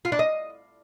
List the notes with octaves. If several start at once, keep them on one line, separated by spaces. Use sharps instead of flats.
F4
D4
D#5